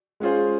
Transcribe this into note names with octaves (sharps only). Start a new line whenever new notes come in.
G#3 C#4 F4 G#4 C5